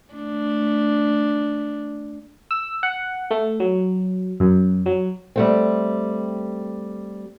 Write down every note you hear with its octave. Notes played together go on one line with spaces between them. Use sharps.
A3 D4
E6
F#5
A3
F#3
F#2
F#3
G3 A3 C4